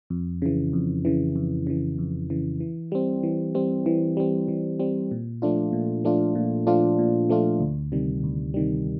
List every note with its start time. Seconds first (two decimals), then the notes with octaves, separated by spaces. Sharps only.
0.10 F2
0.42 C#3 E3
0.73 F2
1.05 C#3 E3
1.36 F2
1.67 C#3 E3
1.98 F2
2.30 C#3 E3
2.60 E3
2.92 G3 C4
3.23 E3
3.55 G3 C4
3.86 E3
4.17 G3 C4
4.48 E3
4.80 G3 C4
5.11 A#2
5.42 F3 A3 D4 F4
5.73 A#2
6.04 F3 A3 D4 F4
6.35 A#2
6.67 F3 A3 D4 F4
6.99 A#2
7.30 F3 A3 D4 F4
7.60 D2
7.92 C3 D#3 G3
8.24 D2
8.54 C3 D#3 G3